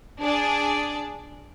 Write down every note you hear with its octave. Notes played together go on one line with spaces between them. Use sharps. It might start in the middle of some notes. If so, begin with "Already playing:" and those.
D4 G#4 D5